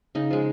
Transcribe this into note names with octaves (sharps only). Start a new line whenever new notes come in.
C#3 D#4
F3 G#3